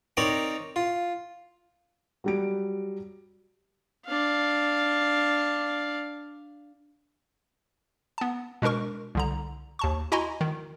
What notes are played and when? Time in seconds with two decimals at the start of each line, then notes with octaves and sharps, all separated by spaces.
0.17 C4 D#4 A#4 C#5 D5
0.76 F4
2.24 F#3 G3 D7
4.06 D4 F5
8.18 B3 A5
8.62 B2 G#3 D4 A#4 C#6
9.15 C2 D3 A#5
9.79 D#2 A5 C#6
10.12 E4 F#4 D#5 G#5 A#5 C6
10.41 D#3